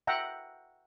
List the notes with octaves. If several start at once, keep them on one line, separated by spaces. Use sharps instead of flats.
E5 F#5 G5 A#5